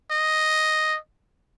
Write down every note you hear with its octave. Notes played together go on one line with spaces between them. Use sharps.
D#5